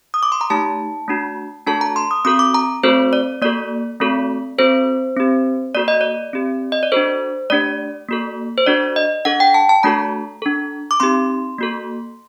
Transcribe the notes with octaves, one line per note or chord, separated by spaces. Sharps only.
D#6
D6
C6
A#5
A3 D#4 G4 A5
A3 D4 F#4
A3 D4 F#4 A4 A5
A#5
C6
D#6
C4 F#4 A4 D#6
D6
A#5
A3 C4 F#4 A4 C5
D5
A#3 F#4 A4 D5
A3 C4 F#4 A4
C4 F#4 A4 C5
C4 G4
A#3 F#4 A4 D5
D#5
D5
C4 G4
D#5
D5
D4 F#4 A4 C5
A3 D4 G4 D5
A#3 F#4 A4
C5
D4 F#4 A4 D5
D#5
D4 A4 F#5
G5
A5
A5
A3 D4 F#4 A4 A#5
D4 A4
D6
C4 D#4 G4 C6
A#3 F#4 A4